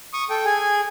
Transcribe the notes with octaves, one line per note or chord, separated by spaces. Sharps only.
C#6 D#6
A4 G5
G#4 G#5